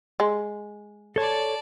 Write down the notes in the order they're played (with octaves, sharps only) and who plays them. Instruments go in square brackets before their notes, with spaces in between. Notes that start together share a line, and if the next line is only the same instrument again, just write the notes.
[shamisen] G#3
[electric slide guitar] A4 C#5 [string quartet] D5 A5